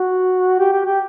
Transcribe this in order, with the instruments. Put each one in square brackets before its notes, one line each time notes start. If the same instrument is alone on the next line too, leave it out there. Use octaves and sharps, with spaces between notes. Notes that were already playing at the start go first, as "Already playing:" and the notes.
Already playing: [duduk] F#4
G4
G4
G4